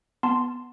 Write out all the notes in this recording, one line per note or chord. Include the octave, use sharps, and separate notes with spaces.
B3 A5 C6